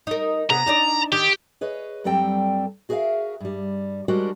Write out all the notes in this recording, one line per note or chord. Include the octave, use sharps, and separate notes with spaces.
D#4 A#4
C3 B3 G#4 A#5
D4 D#4 D5
D#3 G4
G#4 B4 C#5 D#5
G2 F#3 G3 C4 A4 G5
F#4 G#4 A#4 B4 E5 F5
G2 G3
G3 G#3 D4 F#4 A#4 C5